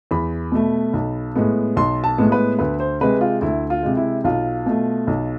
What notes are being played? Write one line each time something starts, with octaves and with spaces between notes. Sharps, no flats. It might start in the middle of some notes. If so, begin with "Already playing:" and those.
E2 B5
B2 A3
B1
A2 G#3 B3
B1 C6
A5
A2 G#3 B3
B4
D2 B4
C5
C3 G#3 B4
F4
D2 E4
F4
C3 G#3
E4
B1 F4
B2 A3
B1